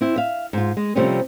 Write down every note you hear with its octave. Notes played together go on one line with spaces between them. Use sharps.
C4 E4
E5 F5
G#2 F4
G#3
C3 F3 G3 A3 C4 C#4